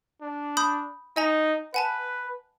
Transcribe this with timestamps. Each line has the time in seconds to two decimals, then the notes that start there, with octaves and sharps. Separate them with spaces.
0.21 D4
0.57 B5 D#6 G6
1.16 D#4 D#5 G#5 A#5
1.74 B4 F#5 G#5 A5